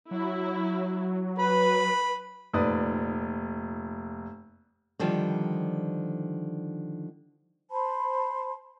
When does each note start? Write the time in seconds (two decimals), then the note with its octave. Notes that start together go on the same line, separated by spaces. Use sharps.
0.11 F#3 E4
1.39 B4 B5
2.53 F1 A#2 D#4 B4 D5 D#6
4.99 D3 D#3 F3 G3
7.71 C5 A5 B5 C6